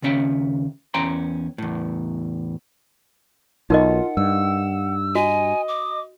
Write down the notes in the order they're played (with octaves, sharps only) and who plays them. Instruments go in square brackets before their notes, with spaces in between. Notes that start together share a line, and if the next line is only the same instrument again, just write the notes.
[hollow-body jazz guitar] D#2 C#3 C#4 E5 G5
E2 C#4 G5 A#5 C6
E2 A2
[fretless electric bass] B1 [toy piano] D#4 A#4 D#5 [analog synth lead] F4 [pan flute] F#5
[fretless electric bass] G2 [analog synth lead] E6
[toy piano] F#4 [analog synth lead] D#5 [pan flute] G#5
[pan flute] D6